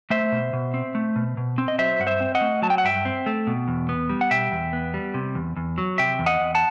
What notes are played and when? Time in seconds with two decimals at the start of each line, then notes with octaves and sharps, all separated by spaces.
0.10 A3 C5 E5
0.32 B2
0.53 B2
0.74 C4
0.95 A3
1.16 B2
1.37 B2
1.58 C4
1.68 D#5
1.79 F#3 C5 E5
2.00 G2 F#5
2.07 C5 E5
2.20 C4
2.35 D#5 F#5
2.41 A3
2.62 F#3 A5
2.70 G5
2.78 F#5
2.84 G2 E5 G5
3.05 C4
3.26 A3
3.47 B2
3.68 E2
3.89 B3
4.09 G3
4.21 F#5
4.31 B2 E5 G5
4.52 E2
4.73 B3
4.94 G3
5.14 C3
5.35 E2
5.57 E2
5.78 F#3
5.98 C3 E5 G5
6.19 E2
6.26 D#5 F#5
6.41 E2
6.55 F#5 A5